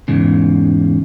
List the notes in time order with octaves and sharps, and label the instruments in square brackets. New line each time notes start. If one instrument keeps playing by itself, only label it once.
[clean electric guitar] E2 G#2 C#3